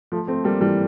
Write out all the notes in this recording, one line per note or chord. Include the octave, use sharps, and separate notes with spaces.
F3 A3
A3 C4
G3 A#3
E3 G3